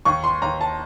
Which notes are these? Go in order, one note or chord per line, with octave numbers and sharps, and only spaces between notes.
D#2 C#6
C6
D#2 A#5
A5